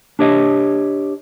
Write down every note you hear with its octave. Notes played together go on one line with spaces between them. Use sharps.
D4 G4 C#5 D#5